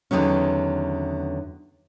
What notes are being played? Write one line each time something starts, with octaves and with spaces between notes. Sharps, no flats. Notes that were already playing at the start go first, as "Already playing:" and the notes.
E2 D3 D#3 F#3 C#4